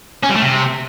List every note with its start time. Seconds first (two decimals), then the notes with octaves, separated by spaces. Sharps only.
0.23 C#4
0.30 G3
0.36 A3
0.42 C3